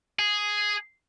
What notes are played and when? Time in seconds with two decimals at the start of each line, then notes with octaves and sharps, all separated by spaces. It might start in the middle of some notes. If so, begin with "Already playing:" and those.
0.19 G#4